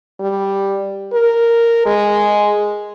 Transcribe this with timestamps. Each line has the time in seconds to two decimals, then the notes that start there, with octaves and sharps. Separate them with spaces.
0.20 G3
1.13 A#4
1.86 G#3